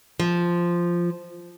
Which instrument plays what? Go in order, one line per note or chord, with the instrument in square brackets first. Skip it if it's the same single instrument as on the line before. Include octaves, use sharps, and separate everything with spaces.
[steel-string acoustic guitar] F3